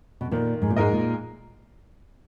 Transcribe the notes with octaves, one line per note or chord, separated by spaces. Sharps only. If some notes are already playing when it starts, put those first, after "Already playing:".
B2
A#2 D#3
G#2
A#2
G#2 G#3 D#4 A#4 D#5
A#2